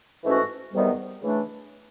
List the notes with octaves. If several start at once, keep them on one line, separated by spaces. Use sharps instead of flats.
G#2 E3 A3 C#4 F#4
E2 C3 D#3 G3 B3
C#3 E3 A3 D4